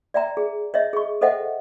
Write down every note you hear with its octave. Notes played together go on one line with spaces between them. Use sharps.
D5 E5 G5 A#5
G#4
C#5 D#5 E5
G#4 C#6
A4 C5 D#5 E5 F#5 G5